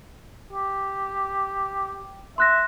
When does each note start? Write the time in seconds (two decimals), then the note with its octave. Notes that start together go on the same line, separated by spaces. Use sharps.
0.53 G4
2.38 E5 C6 F#6 A#6